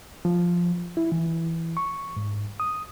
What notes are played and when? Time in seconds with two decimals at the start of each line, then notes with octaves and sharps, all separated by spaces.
0.25 F3
0.97 E4
1.12 E3
1.77 C#6
2.16 G#2
2.60 D#6